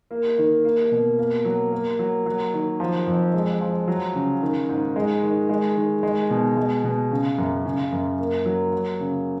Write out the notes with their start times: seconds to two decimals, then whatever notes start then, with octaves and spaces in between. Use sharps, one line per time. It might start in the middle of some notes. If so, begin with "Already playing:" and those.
0.11 A#3
0.38 D#3
0.65 A#3
0.92 B2
1.19 A#3
1.45 F#3
1.72 A#3
1.99 F#3
2.26 F#3
2.54 D#3
2.80 F3
3.07 F2
3.34 G#3
3.61 F3
3.88 F#3
4.15 C#3
4.42 D#3
4.69 G#2
4.96 G#3
5.23 D#3
5.49 G#3
5.77 D#3
6.03 G#3
6.30 B2
6.57 G#3
6.84 B2
7.11 C#3
7.38 F#2
7.65 C#3
7.92 F#2
8.18 A#3
8.45 F#3
8.72 F#3
9.00 C#3